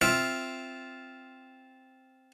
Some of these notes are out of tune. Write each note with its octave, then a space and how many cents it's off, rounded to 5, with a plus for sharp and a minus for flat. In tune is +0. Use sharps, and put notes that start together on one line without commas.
C4 +0 F4 +0 E5 +0